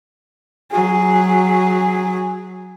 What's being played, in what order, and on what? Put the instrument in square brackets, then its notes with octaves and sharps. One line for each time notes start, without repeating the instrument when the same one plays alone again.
[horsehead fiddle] F#3 G#4